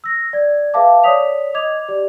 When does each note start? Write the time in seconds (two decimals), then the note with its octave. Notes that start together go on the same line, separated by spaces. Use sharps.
0.04 E6 A#6
0.33 D5 G#6
0.74 G#4 B4 E5 F5 A5 D6
1.04 C#5 D5 D#6 B6 F7
1.54 D#5 D6 G#6 F7
1.88 G4 D5